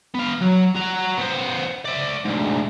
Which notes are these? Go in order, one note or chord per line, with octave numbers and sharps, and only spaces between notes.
B3 F5
F#3
F#4 A#5
B3 C5
D5 E5
D2 G#2